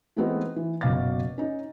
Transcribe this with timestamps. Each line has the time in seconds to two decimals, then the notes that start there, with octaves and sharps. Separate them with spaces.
0.16 E3 G#3 A3 B3 C4 D#4
0.56 E3
0.81 F#1 B2 F5 D6 A6
1.38 C#4 D#4